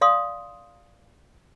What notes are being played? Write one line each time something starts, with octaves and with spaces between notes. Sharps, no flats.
D5 F5 C6 D#6